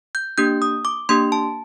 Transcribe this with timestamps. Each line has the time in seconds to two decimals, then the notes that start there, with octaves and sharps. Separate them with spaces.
0.15 G6
0.38 A#3 D4 G4 G6
0.62 D#6
0.85 D6
1.09 A#3 D4 G4 C6
1.32 A5